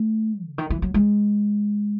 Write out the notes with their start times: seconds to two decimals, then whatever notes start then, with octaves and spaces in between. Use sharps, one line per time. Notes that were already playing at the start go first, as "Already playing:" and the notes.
Already playing: A3
0.46 C#3
0.58 D#3
0.70 E3
0.82 F#3
0.94 G#3